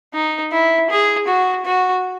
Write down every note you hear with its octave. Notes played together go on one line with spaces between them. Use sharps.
D#4
E4
G#4
F#4
F#4